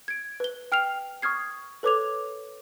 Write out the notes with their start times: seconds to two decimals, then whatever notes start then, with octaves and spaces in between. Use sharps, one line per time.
0.08 G#6 D7
0.40 B4 G7
0.72 G5 F6 C7 F7
1.22 C#6 D#6 F6 G#6 C7
1.83 A4 B4 C#5 D6 G#6 F7